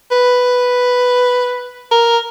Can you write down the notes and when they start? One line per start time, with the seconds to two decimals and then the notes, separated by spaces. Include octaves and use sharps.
0.11 B4
1.91 A#4